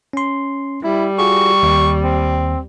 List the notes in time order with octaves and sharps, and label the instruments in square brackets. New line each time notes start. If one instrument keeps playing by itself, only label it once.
[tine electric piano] C#4 C6
[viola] G3 [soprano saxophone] E4
[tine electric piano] F4 F#4 G#4 [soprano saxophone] C#6
[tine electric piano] D#2
[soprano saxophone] C4